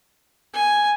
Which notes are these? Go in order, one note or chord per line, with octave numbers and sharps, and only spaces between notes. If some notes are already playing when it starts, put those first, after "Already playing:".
G#5